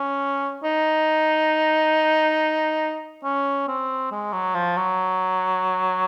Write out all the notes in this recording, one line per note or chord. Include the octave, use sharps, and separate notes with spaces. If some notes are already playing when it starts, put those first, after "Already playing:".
Already playing: C#4
D#4
C#4
C4
G#3
F#3
F3
F#3